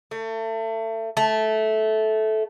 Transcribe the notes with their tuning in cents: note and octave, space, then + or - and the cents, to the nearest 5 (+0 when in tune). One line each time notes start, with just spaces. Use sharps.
A3 +30
A3 -15